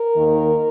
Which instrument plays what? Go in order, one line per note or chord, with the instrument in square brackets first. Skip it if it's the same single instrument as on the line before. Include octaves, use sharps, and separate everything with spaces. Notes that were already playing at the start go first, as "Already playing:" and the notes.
Already playing: [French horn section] A#4
D#2 D#3 A#3